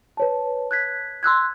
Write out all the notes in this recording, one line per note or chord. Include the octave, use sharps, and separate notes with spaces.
B4 C#5 A5
F#6 G#6 B6
C6 E6 F#6 G#6